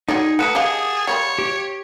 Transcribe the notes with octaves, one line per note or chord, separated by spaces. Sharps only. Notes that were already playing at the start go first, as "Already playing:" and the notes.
D#4 F#4 G#4 C#5 D5
A3 A#3 A#4 B4 F#5 A5 D#6
G4 G#4 D#5 F5
G3 A#3 C#5 B5
G4